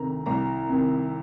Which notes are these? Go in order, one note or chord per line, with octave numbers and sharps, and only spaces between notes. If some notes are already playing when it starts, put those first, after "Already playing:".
Already playing: D2 C3 D#3 A#5
C2 A#5
C3 D#3